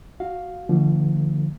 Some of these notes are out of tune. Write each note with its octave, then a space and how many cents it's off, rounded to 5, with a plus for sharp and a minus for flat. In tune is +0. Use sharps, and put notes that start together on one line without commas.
F#4 +0 F5 +5
D3 +10 F3 -30 A3 +35